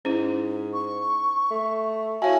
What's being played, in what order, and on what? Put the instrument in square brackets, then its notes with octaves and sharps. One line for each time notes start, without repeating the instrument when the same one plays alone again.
[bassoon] G#2 [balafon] C#4 E4
[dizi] C#6
[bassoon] A3
[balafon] E4 C#5 A5 [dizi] F#4 [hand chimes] E5 F5 G#5